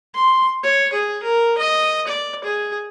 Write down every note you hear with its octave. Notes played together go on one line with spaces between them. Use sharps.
C6
C#5
G#4
A#4
D#5
D5
G#4